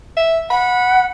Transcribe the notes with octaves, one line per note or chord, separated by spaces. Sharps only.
E5
F#5 B5